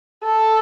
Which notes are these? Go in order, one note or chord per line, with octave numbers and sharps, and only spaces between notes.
A4